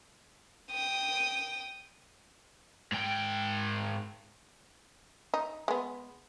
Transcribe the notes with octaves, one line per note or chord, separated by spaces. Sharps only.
G5 D#6
G#2 G5
D#4
G#3 B3